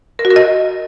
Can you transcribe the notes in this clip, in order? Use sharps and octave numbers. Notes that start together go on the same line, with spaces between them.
A#4
F#4
A#4
D#5